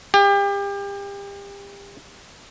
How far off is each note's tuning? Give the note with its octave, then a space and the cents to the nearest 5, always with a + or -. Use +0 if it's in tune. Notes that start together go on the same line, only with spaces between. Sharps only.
G4 +35